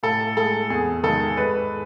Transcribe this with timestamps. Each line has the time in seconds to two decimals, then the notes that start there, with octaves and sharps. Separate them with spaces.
0.03 A2 A4
0.37 G#3 A4
0.70 E2 G#4
1.03 D#3 G#3 A4
1.37 G#2 B4